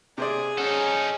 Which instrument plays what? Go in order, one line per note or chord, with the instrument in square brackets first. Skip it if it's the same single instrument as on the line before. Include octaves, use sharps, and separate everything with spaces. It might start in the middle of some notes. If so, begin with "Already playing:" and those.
[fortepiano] C3 C5 D5 [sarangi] G#4
[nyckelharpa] C#4 [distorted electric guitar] D#4 A4 [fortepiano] F#5